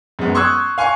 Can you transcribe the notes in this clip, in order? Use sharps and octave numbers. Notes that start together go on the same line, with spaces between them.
F#2 G#3 B3
C6 C#6 D#6 E6 F#6 G#6
F5 G#5 C6 C#6